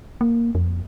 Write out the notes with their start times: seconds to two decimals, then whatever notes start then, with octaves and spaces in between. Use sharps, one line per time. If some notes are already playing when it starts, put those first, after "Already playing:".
0.21 A#3
0.55 F2